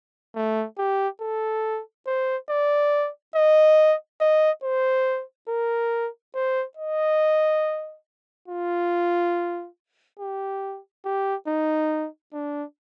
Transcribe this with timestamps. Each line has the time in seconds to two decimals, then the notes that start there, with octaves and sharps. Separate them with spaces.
0.36 A3
0.78 G4
1.21 A4
2.07 C5
2.50 D5
3.35 D#5
4.21 D#5
4.63 C5
5.49 A#4
6.35 C5
6.77 D#5
8.48 F4
10.19 G4
11.05 G4
11.48 D#4
12.33 D4